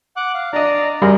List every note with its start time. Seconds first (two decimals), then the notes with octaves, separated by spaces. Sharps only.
0.16 F#5 D6 F#6
0.34 F5
0.53 D4 D5 D#5 A#5
1.02 F#2 G3 G#4 A#4